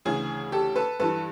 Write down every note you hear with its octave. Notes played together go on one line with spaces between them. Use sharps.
D2 C#3 E3 G#4
G4 A4
A4 B4
G2 E3 A4 B4